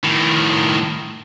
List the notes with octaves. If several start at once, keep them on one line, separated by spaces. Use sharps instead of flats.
A2 D#3